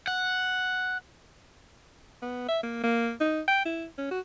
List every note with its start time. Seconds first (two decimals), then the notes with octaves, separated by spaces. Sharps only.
0.08 F#5
2.22 B3
2.48 E5
2.63 A#3
2.84 A#3
3.20 D#4
3.48 G5
3.65 E4
3.98 C#4
4.11 F#4